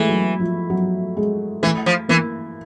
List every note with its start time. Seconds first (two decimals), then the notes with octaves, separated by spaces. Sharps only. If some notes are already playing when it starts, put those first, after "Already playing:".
Already playing: E3 G#3 A3
0.09 F#3
0.40 F3
0.70 F#3
1.17 G#3
1.63 E3 A3
1.86 F3
2.09 E3 A#3